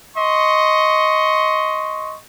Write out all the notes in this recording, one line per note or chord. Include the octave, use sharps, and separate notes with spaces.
D#5 C6 C#6